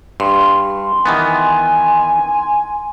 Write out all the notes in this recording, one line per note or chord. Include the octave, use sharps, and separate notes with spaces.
G2 C6
D#3 E3 B3 G#5